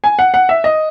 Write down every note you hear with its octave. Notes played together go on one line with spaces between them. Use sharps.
G#5
F#5
F#5
E5
D#5